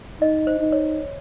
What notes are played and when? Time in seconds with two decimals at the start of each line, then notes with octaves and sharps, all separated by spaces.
0.21 D#4 D#5
0.47 C5
0.60 D#4
0.72 C#5